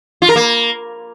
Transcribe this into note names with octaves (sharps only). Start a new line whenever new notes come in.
F4
A#4
A#3